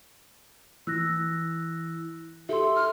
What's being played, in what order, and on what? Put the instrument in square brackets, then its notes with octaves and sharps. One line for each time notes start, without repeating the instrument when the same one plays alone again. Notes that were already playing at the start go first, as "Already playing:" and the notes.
[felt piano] E3 [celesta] E6 F#6 A#6
[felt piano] G4 [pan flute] A4 [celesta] E5 C6
[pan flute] F6